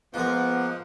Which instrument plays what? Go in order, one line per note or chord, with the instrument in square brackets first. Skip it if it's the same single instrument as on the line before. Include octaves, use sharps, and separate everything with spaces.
[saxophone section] F3 [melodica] G#3 A#3 F#5 [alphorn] B3 [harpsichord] F4 A#4